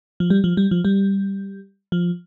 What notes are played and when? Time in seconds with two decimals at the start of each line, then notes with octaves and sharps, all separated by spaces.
0.20 F3
0.30 G3
0.44 F3
0.57 G3
0.71 F3
0.85 G3
1.92 F3